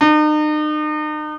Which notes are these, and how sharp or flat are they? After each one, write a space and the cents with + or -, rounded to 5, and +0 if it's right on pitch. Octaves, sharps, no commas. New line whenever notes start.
D#4 -40